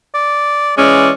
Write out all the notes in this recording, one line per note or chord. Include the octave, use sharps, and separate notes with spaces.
D5
E3 G#3 C#4 D5